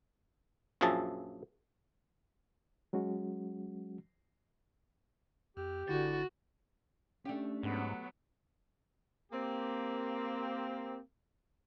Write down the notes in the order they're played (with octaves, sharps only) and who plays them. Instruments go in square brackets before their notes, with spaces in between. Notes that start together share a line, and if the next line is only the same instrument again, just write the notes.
[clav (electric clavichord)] A#1 F#2 F3 G#4 E5 A5
[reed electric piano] F#3 G#3 C#4 F#4
[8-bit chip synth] F2 [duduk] G4
[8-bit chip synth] G1 E4 A6 [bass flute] D3 [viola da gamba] F#4
[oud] A3 G4 [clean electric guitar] C#4 D4
[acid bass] G#2 [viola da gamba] F#3 B3
[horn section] A#3 C4 G4